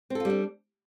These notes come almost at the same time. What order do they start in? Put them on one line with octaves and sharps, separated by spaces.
C4 A4 F4 G3 D4